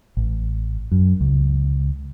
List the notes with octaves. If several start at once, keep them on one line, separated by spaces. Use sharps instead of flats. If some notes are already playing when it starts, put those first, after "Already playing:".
A1
F#2
C#2